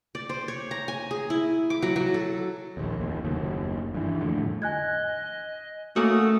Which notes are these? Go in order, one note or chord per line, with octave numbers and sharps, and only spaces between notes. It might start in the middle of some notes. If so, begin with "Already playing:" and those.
D5
C5
C#5
A#5
G#5
G#4
E4
D6
F#3
F#3
A4
A#1 D#2
F1 D#2
F#1 D#2
G2 E3
F2 A2 D3
D#5 G#5 F#6 G#6
A3 A#3 C#4 F#4 D#6